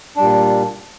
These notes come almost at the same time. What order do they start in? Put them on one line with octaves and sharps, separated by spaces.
D4 G3 A#2